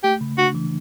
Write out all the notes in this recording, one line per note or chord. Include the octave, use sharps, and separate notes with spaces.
A3 G4
C#3
D4 F#4
E3